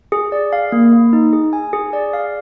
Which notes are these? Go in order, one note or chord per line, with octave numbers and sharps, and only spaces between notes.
G#4
D5
F5
A#3
A#3
D#4
G#4
G#5
G#4
D5
F5